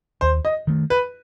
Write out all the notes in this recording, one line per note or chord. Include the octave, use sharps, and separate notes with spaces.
D#2 C5
D#5
D#3 A3
B4